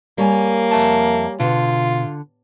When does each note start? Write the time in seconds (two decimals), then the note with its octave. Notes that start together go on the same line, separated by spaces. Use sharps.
0.18 G3 A#3 C#5 G#5
0.71 F2 E5 A5
1.40 B2 D3 F4